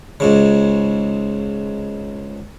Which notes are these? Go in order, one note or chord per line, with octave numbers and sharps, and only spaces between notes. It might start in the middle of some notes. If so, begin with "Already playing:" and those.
C#2 G#2 C#3